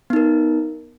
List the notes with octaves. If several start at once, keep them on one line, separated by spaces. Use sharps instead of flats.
B3 D#4 A#4